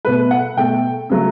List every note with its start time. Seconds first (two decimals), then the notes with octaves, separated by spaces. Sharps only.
0.05 B2 A3 B4
0.31 F#5
0.57 B2 A3 G5
1.10 C#3 F#3 A3